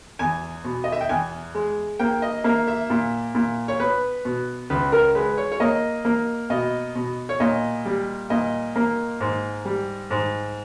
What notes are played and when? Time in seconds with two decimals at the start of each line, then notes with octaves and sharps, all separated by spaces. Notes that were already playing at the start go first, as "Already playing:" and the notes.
0.19 E2 G#5
0.64 B2
0.84 D#5
0.92 E5
1.01 G5
1.09 E2 G#5
1.55 G#3
1.99 A#3 G5
2.22 D#5
2.44 A#3 E5
2.68 E5
2.90 A#2
3.35 A#2
3.68 C#5
3.80 B3 B4
4.25 B2
4.70 C#2 B4
4.92 A#4
5.15 G#3 B4
5.38 C#5
5.52 C#5
5.60 A#3 D#5
6.05 A#3
6.50 B2 D#5
6.95 B2
7.29 C#5
7.40 A#2 D#5
7.86 G3
8.30 A#2 D#5
8.76 A#3
9.20 G#2
9.65 G3
10.11 G#2